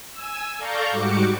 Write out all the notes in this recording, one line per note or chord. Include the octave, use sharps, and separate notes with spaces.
G#5 E6
A4 D5 F5 A#5 C#6 G6
G#2 G3 F#4 D6 C#7